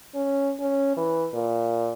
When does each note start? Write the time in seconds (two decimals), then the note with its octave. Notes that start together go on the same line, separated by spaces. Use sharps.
0.15 C#4
0.60 C#4
0.97 E3
1.34 A#2